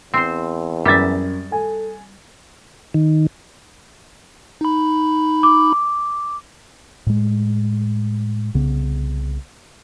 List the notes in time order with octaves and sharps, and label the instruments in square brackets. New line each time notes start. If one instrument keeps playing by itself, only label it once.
[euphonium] E2 [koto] C4 C5
[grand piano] F#2 A6 [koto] G3 E5
[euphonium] A4 [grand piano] G#5
[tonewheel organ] D#3
[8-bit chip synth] D#4 B5
[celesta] D6
[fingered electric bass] A2 G#3
C2 C#3 B3